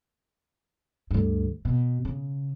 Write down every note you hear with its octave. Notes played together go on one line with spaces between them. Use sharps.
D2 G2
B2
C#3